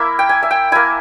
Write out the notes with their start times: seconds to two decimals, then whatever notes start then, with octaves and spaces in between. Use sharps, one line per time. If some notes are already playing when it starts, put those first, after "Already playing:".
Already playing: A#3 E4 E5
0.19 G5
0.29 G#5
0.43 E5
0.51 G5
0.72 A#3 E4 G#5